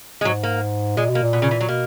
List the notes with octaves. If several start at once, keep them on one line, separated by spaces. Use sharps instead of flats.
G#3
G#2 F#3
A#3
A#2 G#3
B2
A#3
A#2
B2
C#3
E3
F#3
B2 A#3